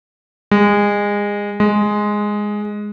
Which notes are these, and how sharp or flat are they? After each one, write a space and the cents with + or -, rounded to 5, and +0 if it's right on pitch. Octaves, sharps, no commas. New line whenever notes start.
G#3 -25
G#3 +0